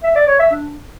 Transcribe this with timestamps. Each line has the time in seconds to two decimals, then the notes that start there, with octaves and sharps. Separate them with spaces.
0.04 E5
0.15 D5
0.27 C#5
0.39 E5
0.51 D4